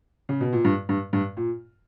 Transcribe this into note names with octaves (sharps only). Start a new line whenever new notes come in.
C#3
B2
A#2
G2
G2
G2
A#2